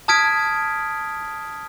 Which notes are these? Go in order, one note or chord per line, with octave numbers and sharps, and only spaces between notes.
A5 D#6 F6 G#6 B6 D7